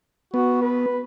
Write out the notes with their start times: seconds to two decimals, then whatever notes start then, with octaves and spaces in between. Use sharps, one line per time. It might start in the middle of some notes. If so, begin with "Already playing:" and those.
0.34 B3 F#4
0.62 B4